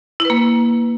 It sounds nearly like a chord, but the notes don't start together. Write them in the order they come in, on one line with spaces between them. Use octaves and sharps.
E4 B4 A#3